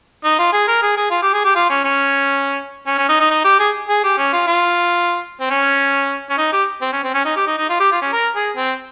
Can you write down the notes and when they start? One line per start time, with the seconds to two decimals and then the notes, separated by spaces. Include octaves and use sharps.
0.25 D#4
0.39 F4
0.53 G#4
0.68 A#4
0.82 G#4
0.97 G#4
1.11 F4
1.22 G4
1.33 G#4
1.45 G4
1.56 F4
1.70 C#4
1.84 C#4
2.87 C#4
2.98 C#4
3.09 D#4
3.20 D#4
3.31 D#4
3.45 G4
3.60 G#4
3.89 G#4
4.04 G4
4.18 C#4
4.33 F4
4.47 F4
5.40 C4
5.51 C#4
6.30 C#4
6.38 D#4
6.53 G4
6.82 C4
6.93 C#4
7.04 C4
7.15 C#4
7.25 D#4
7.36 G4
7.47 D#4
7.58 D#4
7.70 F4
7.80 G4
7.92 F4
8.02 C#4
8.13 A#4
8.36 G#4
8.57 C4